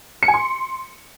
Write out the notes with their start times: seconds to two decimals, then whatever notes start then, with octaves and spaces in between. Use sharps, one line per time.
0.23 C#7
0.28 G#5
0.34 C6